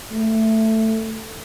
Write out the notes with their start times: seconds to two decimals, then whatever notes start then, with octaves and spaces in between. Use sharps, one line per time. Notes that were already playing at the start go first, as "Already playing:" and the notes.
0.11 A3